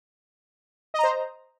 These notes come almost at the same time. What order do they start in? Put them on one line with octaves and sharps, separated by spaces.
D#5 A#5 C5